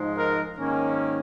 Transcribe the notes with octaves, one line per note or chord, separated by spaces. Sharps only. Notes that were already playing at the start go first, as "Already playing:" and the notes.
Already playing: G#2 F3 G#3 D#4
A#4
G#2 D#3 A#3 C#4